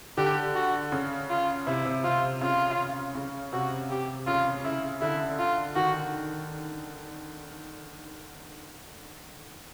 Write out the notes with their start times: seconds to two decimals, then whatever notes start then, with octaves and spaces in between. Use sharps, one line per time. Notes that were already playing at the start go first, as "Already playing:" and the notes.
0.17 D3 G4
0.55 F#4
0.92 C#3
1.30 F4
1.66 C3 E4
1.85 C3
2.03 C3 F4
2.41 C#3 F4
3.15 C#3
3.53 C3 F#4
3.90 G4
4.27 C#3 F4
4.64 C#3 E4
5.01 D3 E4
5.39 F4
5.75 D#3 F#4